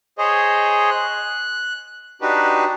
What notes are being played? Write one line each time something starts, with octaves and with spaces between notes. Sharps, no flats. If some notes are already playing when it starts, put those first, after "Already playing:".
G#4 C5 C#5 D#5
F#6
D4 D#4 F#4 G4 B4